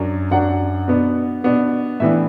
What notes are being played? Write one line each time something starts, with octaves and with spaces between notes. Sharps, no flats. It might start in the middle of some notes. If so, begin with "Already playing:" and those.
Already playing: F#2 F#3 D4
F#2 F#3 D4 F#5
B2 B3 D4
B2 B3 D4
A2 E3 B3 D4 E5